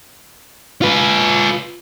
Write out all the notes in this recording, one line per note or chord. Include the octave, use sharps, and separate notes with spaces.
F4 B4